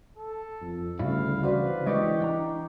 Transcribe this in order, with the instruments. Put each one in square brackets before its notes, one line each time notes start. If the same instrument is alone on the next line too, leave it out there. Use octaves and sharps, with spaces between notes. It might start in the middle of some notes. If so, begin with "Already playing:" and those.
[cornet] A4
[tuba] F2
[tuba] D2 [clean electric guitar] C#3 G3 E4 [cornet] F5
[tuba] E3 [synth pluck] F#4 C5 D5 [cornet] B4
[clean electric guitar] G#3 D4 D5 [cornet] G4 [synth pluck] D#5 C#6
[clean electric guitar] D4 G5 A#5